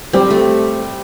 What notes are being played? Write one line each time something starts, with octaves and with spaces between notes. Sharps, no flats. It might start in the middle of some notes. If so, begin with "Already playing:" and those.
G3 C4 G4
A3